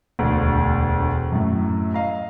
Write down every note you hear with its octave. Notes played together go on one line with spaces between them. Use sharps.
E1 D2
F#2 A2
D#5 F5 A#5